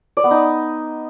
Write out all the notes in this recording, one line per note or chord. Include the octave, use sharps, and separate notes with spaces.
D5
B3
D#4